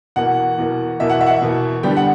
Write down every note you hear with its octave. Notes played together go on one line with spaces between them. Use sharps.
E2 B2 A#3 F#5
E2 B2 A#3
E2 B2 A#3 E5
F#5
E5
F#5
E5
E2 B2 A#3
D3 G3 B3 D4 G5
F#5